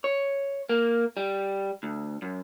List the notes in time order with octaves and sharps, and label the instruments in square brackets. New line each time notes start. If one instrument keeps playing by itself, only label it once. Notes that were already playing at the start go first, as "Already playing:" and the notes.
[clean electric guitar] C#5
A#3
G3
D2
F#2